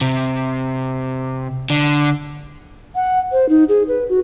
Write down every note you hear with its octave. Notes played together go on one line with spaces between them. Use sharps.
C3
D3
F#5
C5
D#4
G#4
B4
F#4